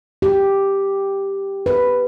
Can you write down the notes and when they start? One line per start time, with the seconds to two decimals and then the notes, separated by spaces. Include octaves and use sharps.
0.22 G4
1.66 B4